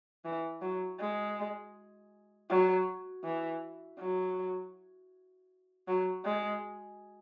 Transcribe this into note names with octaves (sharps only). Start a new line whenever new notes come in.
E3
F#3
G#3
F#3
E3
F#3
F#3
G#3